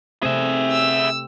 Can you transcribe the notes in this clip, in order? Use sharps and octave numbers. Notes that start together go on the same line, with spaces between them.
C3 A3 C4 G#4 E5
E6